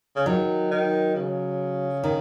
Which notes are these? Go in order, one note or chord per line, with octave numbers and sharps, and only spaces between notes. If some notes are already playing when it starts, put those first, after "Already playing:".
C#3
D#3 F#3
D#3
C#3
D#3